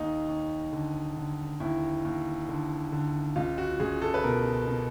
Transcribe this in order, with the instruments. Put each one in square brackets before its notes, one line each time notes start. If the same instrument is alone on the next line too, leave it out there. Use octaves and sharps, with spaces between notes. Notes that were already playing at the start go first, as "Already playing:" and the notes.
Already playing: [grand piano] D#2 D#4
D#2
D3
D3
D#2 E4
D#2
D3
D3
C#2 F4
F#4
C#2 G#4
A4
B4
B2 A#4
B2